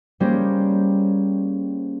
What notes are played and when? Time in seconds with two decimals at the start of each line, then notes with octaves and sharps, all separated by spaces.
0.20 G3 A#3 C#4 G4 G#4 C5